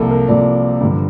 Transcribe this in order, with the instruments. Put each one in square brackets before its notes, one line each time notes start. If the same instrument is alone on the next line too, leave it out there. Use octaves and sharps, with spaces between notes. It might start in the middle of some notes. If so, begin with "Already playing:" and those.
Already playing: [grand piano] C2 A#2 F3 A#3 A4
A#4
C2 A#2 F3 A#3 D5
G2 D3 F3